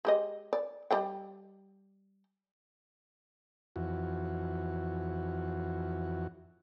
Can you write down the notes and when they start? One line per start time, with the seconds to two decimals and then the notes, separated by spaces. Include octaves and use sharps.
0.05 G#3 G4 D#5
0.53 D5
0.91 G3 D#5 G5
3.76 F2 E3 F#4